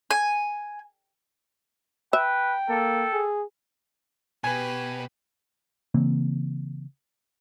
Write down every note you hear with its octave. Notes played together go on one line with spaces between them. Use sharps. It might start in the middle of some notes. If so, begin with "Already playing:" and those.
G#5
B4 E5 G5
A#3 A4
G#4
B2 G4 B4 G#5
C#3 E3 A#3 C4